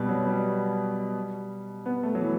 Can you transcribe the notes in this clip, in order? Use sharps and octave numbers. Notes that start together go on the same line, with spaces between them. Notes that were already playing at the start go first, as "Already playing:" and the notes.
Already playing: B2 G3
F#3
G3
B3
A3
F#3
E3